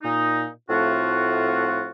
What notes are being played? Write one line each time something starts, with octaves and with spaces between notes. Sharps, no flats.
A#2 D#4
A2 F3 A3 C4 F4 F#4